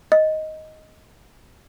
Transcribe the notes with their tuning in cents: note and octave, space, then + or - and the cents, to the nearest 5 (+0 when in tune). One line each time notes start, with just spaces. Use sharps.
D#5 +5